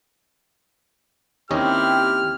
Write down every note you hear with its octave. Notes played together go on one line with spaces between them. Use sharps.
D#2 C4 C#4 E4 G4 D#5 F6